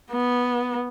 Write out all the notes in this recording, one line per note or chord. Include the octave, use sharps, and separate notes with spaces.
B3